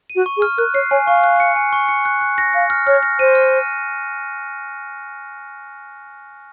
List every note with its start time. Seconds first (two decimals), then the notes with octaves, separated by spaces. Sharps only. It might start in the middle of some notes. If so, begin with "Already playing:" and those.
0.10 D#7
0.15 F#4
0.26 C#6
0.37 G#4
0.42 F6
0.58 A#4 F#6
0.74 C#5 C7
0.91 C#5 G#5
1.07 F5 C#6
1.24 F#6
1.40 C#7
1.56 G#5
1.73 C#6
1.89 C#7
2.05 F#6
2.21 F#6
2.38 A#6
2.53 F5 C#7
2.70 F6
2.87 C#5 F6
3.03 A#6
3.19 C5 D#7
3.35 F6